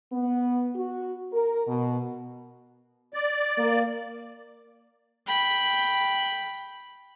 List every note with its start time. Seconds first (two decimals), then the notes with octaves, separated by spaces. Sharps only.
0.12 B3
0.75 F#4
1.32 A#4
1.67 B2
3.14 D5
3.58 A#3
5.27 G5 B5